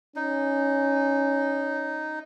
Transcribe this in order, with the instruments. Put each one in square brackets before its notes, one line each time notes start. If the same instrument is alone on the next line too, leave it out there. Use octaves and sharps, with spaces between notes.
[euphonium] C#4 [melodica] D#4